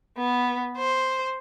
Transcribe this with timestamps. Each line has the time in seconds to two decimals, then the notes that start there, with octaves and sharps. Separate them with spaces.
0.18 B3
0.77 C5